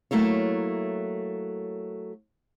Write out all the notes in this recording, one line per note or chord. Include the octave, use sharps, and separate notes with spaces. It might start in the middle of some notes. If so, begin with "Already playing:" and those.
F#3 A3 A#3 E4 C#5